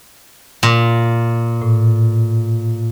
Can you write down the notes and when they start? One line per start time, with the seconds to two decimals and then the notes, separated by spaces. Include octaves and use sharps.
0.63 A#2
1.62 A2